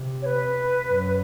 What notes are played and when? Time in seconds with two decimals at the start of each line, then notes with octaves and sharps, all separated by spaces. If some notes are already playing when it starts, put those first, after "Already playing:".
Already playing: C3
0.22 C#5
0.26 B4
0.88 F#2